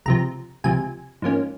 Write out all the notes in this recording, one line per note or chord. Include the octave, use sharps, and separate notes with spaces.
C#2 C3 F3 A#5
C#2 C3 F3 G#5
G#2 F3 A#3 C#4